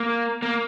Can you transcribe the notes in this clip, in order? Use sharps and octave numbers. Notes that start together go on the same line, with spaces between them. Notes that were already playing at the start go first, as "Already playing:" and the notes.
Already playing: A#3
A#3